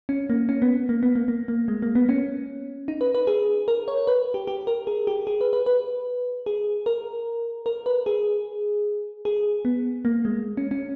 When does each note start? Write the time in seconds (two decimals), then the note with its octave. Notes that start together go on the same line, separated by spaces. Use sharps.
0.09 C#4
0.30 A#3
0.49 C#4
0.62 B3
0.89 A#3
1.03 B3
1.15 A#3
1.28 A#3
1.48 A#3
1.68 G#3
1.82 A#3
1.95 B3
2.09 C#4
2.88 D#4
3.01 B4
3.15 B4
3.27 G#4
3.68 A#4
3.88 C#5
4.07 B4
4.34 G4
4.47 G4
4.67 A#4
4.87 G#4
5.07 G4
5.27 G#4
5.41 B4
5.53 B4
5.66 B4
6.46 G#4
6.86 A#4
7.66 A#4
7.86 B4
8.06 G#4
9.25 G#4
9.65 B3
10.05 A#3
10.25 G#3
10.57 C#4
10.71 C#4